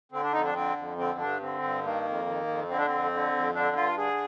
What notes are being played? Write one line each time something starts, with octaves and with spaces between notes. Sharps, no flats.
D3 C4
D4
F2 D#4
D4
D3 C4
F2
D3 C4
G2 D4
D3 C4
G2
D#3 A#3
F2
D#3
F2
D3 C4
D4
F2 C4
D3
F2
D3 D4
G2 F4
D3 G#4